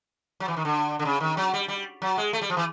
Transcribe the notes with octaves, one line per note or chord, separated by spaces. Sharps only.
F#3
E3
D#3
D3
D3
C#3
D#3
F#3
G3
G3
F#3
G#3
A3
G3
F3
E3